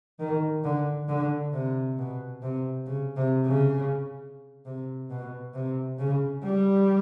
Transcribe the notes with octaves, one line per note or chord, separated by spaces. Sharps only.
D#3
D3
D3
C3
B2
C3
C#3
C3
C#3
C3
B2
C3
C#3
G3